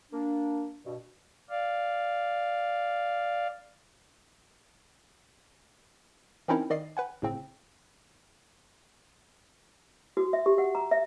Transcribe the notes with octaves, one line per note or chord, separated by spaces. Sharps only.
A#3 D4
G2 B2
D5 F5
E3 C4 C#4 D#4 E4 A#4
D#3 D5 D#5 C7
B4 F#5 G#5
G1 A2 C#3 C4
F#4
E5
G4
F#5
A#5
E5